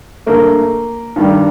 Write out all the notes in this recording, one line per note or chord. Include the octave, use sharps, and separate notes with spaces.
G2 D3 A3 A#3
G2 D#3 G3